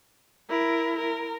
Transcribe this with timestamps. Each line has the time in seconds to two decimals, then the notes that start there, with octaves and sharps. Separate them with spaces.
0.50 E4 A#4
0.98 A#4